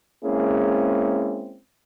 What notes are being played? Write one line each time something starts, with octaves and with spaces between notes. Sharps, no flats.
G#3 A#3 C4 C#4 E4 G#4